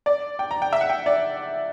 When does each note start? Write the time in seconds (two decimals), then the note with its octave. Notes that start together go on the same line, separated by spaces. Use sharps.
0.06 D5
0.39 G5
0.51 A#5
0.62 G5
0.73 E5
0.81 F#5
0.90 G5
1.06 D5